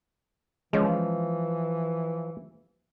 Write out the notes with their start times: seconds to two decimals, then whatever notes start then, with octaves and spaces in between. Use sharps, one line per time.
0.73 E3 F3 G#3 C#4